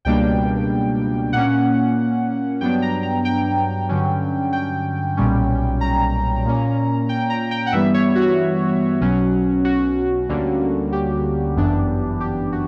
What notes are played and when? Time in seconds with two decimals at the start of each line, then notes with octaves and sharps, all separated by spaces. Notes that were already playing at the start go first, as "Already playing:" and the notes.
0.05 C#2 B2 G3 A#3 D4 G5
1.33 A#2 A#3 C#4 F#5
2.61 G2 F#3 B3 D4 G5
2.82 A#5
3.03 A#5
3.25 G5
3.89 G2 D3 F#3 C#4
4.53 G5
5.17 B1 A#2 G3 C#4
5.81 A#5
6.45 A#2 A#3 C#4
7.09 G5
7.30 A#5
7.51 G5
7.66 F#5
7.72 G2 E3 G3 B3 E5
7.94 C#5
8.15 F#4
9.01 B1 B2 F#3 C#4
9.65 F#4
10.28 D2 D3 G3 A#3 C#4
10.92 G4
11.57 G1 F#2 E3 B3 D4
12.21 G4
12.52 F#4